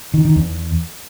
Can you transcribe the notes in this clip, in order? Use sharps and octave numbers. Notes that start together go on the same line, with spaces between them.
D#3
D#3
E2